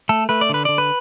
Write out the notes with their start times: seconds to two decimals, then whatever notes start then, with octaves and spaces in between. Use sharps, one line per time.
0.09 A3 A4
0.29 A3 B4
0.41 D5
0.49 D3 B4
0.65 D3 D5
0.78 B4